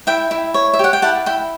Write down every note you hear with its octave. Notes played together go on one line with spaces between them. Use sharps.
E4 E5 G5
E4
C#5
E5
G4 F#5
G5
E4 F#5 A5
E4 G5 B5